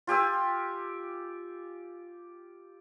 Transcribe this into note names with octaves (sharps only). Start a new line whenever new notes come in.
F4 G4 G#5 E6